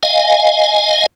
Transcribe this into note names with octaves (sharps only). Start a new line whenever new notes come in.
D#5 F5 G#5